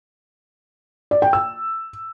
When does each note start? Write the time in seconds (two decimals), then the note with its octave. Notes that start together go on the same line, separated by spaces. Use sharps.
1.11 D5
1.22 G5
1.33 E6